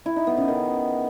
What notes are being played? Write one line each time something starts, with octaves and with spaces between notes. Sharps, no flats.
E4
D#4
B3
C#3
D#3